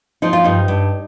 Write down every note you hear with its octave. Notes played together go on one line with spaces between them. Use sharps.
F3 D#4
F4
G2 D#4
G2